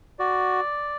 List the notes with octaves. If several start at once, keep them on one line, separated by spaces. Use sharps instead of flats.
F#4 D5